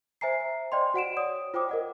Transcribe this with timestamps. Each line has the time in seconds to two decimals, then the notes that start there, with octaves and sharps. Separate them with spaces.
0.21 C5 E5 G#5 A#5 C7
0.72 C5 D5 D#5 G5 C6
0.94 F#4 F#5 D7 E7
1.17 C#5 D5 D#6
1.54 F4 C5 G5 D6 D#6
1.69 A#4 D#5 F#5